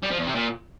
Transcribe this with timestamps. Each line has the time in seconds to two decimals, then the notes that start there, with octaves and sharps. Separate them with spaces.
0.03 G3
0.11 F3
0.19 E2
0.27 C3
0.35 A#2